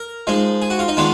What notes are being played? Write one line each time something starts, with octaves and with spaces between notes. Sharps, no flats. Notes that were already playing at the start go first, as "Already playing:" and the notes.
Already playing: A#4
F3 G#3 D#4
G#4
F#4
F4
D#4
D#3 G#3 B3 D4 F4